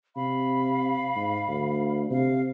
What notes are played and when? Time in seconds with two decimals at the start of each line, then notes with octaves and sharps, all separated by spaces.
0.16 C3 F5 B5
1.16 G#2
1.49 D2
2.11 C3 F5